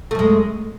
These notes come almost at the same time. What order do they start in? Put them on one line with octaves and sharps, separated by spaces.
A3 F#2 G#3